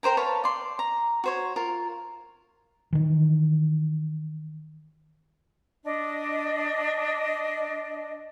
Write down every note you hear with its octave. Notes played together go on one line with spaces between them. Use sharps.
A#4 C5 G5 A#5
B4 C#5 F5 A5
D5 C6
A#5
F#4 C5 C#5
F4 A#4
D#3 E3
D4 D#5